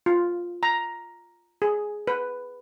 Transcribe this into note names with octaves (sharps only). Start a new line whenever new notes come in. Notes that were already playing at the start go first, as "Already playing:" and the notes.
F4
A#5
G#4
B4